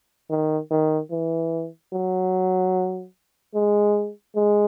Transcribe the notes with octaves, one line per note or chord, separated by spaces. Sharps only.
D#3
D#3
E3
F#3
G#3
G#3